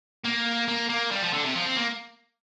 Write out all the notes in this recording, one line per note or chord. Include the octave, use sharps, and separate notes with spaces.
A#3
A#3
A#3
G3
F3
D3
C3
F3
C4
A#3